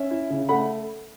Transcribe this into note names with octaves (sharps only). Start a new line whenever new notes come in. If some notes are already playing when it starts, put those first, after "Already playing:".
Already playing: C#4 E5
E4
C#3
A3 F#5 B5